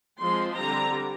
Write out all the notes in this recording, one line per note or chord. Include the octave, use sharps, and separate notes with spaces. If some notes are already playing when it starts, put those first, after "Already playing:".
F3 G#3 C4 C6
D3 G3 C4 A#5